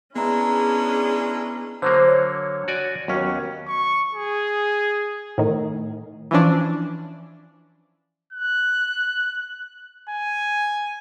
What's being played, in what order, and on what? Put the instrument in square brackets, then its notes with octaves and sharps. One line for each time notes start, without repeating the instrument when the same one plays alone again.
[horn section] G#3 D4 E4 [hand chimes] B3 A#5 [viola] C#4 G#4
[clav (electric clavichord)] D3 F#3 A#3 [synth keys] C5
[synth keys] C#5
[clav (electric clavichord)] F#4 D5 G#5
[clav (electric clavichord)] D#2 C#4 [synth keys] F#3 B3 F#4
[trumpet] C#6
G#4
[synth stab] A2 D#3
[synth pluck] E3 F3 C#4 D4
[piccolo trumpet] F#6
G#5